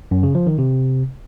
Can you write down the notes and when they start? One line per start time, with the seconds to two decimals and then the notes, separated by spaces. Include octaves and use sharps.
0.11 F#2
0.23 C#3
0.35 F3
0.47 D#3
0.58 C3